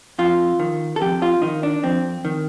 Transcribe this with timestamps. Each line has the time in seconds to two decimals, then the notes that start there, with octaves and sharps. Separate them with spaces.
0.19 F2 F4
0.60 D#3
0.96 A4
1.01 F2 G4
1.22 F4
1.42 D#3 D#4
1.63 D4
1.83 F2 C4
2.25 D#3